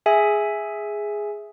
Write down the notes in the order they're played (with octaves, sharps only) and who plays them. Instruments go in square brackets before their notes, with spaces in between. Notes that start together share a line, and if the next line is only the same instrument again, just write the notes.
[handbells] G#4 E5 G#5